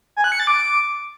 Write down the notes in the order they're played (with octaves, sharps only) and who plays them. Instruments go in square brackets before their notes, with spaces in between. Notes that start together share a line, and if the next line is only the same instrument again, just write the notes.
[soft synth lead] G#5
F#6
C#7
A6
D6